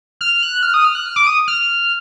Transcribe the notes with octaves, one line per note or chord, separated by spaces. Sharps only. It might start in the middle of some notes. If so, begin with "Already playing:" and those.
F6
F#6
F6
D#6
F6
F#6
F6
D6
D#6
F6